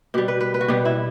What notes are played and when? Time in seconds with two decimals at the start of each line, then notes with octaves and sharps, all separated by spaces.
0.14 B2 G3 G4
0.28 B4
0.41 B4
0.54 B4
0.61 F#4
0.68 B2 G3 G4
0.85 E4